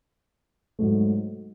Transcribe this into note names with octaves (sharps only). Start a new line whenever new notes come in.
G#2 F#3 A3